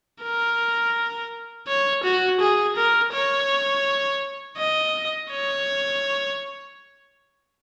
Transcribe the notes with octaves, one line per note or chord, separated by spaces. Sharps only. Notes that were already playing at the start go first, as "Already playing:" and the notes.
A#4
C#5
F#4
G#4
A#4
C#5
D#5
C#5